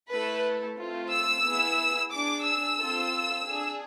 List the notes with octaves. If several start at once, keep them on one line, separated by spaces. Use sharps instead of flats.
A3 E4 A4 B4
A3 C4 F4
E6
B3 E4 G#4
D4 G#4 D6
E6
C4 F4 A4
D4 G#4